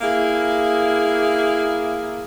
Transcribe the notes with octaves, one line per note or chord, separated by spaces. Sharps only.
A#3 E4 G#4